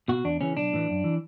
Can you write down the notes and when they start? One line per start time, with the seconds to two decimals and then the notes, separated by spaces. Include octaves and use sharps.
0.08 B2 F#4
0.24 E2 D4
0.41 C#3 E3 C#4
0.57 B1 D4
0.73 A2 E3
0.89 F#2
1.04 E3